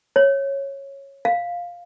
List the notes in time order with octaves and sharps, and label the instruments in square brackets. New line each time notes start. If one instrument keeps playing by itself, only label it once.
[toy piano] C#5
F5